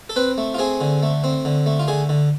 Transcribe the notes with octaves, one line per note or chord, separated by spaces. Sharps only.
A4
C4 B4
A3
F4
C4 G#4
D3
A3
C4
D3
A3
F4
D3 G#4
D3